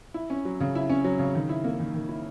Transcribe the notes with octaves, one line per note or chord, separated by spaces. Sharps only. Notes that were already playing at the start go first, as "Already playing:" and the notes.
E4
C#4
F#3
C#3
E4
C#4
F#3
C#3
D#3
E4
A#3
D#3
D#3
E4